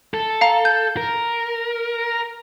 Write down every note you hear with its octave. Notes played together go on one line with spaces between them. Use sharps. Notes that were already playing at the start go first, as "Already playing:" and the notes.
A4
F5 A#5
G6
A#4